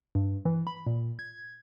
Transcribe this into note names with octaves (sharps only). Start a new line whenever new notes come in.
G2
E3
B5
A#2
G#6